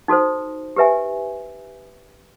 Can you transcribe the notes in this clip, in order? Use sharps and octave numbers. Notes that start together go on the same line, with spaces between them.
D#4 F#4 A4 C5
G4 B4 E5 G#5